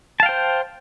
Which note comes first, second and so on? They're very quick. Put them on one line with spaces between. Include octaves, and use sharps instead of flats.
A5 F5 G5 C5